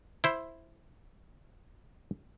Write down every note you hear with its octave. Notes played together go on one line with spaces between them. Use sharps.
E4 C5